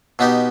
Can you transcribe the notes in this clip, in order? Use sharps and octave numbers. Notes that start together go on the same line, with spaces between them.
B2 B3 D#4 G4